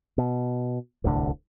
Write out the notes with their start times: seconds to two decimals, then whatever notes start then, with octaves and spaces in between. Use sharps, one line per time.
0.18 B2
1.04 D1 C2 A2 D3